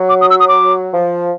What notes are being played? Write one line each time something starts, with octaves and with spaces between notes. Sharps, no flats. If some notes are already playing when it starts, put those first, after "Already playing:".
Already playing: F#3
D6
D#6
E6
D#6
D6
F3